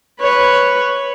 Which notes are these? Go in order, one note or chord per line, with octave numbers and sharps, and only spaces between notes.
B4 C#5